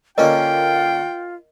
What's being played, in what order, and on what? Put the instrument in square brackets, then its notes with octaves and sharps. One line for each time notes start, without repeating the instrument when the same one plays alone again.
[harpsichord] D3 A#3 C#4 [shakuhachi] F4 [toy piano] A#4 D#5 [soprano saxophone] G5